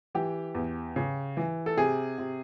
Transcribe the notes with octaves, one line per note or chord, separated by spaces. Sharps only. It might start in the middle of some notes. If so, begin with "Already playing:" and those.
E3 G4
E2
C#3
E3
A4
C3 G#4
C3